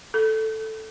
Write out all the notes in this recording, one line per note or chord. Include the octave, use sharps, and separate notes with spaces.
A4